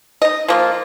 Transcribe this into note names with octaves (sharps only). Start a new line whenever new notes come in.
D#4 D#5
F3 A#3 F4